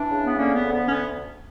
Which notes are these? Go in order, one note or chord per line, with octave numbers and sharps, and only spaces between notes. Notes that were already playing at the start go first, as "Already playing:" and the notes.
Already playing: E3 D4
C#3
B3
D3 A#3 C#4
B3
D2
B3
C#4
B3